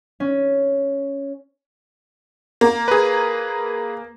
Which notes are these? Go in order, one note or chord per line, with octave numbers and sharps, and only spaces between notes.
C#4
A#3
G#4 B4